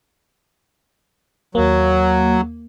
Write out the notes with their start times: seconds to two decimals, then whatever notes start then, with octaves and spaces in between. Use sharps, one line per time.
1.55 D#2 F#3 A#3